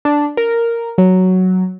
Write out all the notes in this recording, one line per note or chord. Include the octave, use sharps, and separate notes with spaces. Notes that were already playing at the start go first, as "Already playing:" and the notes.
D4
A#4
F#3